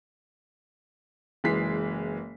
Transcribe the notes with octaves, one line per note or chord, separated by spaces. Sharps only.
F#1 E3 G#3 B6 C7